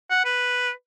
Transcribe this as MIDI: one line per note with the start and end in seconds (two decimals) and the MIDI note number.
0.10 0.24 78
0.25 0.71 71